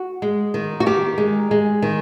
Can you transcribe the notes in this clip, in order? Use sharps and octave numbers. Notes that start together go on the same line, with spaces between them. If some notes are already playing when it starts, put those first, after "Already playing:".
Already playing: F#4
G#3
D#3
F#4
D#3 G4
G#3
G#3
D#3